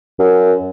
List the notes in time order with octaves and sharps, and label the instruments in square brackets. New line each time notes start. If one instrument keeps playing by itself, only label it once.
[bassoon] F#2